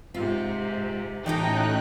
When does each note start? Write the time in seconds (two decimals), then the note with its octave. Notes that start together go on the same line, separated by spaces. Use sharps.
0.14 G#2 C3 F4
1.26 A2 E3 C#4 D#4 F#4 A4 G5 F#6